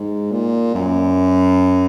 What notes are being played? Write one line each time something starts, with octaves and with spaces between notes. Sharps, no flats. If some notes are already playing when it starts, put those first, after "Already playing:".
Already playing: G#2
A#2
F#2